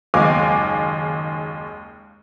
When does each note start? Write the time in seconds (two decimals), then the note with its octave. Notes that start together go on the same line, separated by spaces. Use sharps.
0.14 F#1 D#2 G#3 F5 G#5 D6